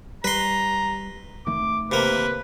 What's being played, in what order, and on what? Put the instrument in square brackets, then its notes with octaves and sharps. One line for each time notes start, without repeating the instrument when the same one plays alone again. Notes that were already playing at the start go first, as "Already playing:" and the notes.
[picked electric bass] G3 [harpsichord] B4 C6 [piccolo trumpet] A#5
[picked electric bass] F1 D#3 A3 [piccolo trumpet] D6
[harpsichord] C3 A#3 [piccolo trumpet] B4